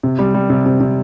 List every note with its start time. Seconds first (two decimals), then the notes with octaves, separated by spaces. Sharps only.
0.03 C3
0.19 G3
0.34 G3
0.50 C3
0.66 C3
0.80 C3